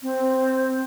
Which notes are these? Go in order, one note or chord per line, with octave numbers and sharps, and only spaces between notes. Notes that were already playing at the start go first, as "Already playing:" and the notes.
C4